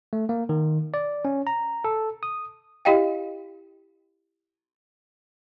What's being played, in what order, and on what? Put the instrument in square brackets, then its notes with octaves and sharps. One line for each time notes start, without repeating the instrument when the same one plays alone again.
[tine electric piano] A3
A#3
D#3
D5
C#4
A#5
A4
D#6
[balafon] E4 G4 D#5 F5 G5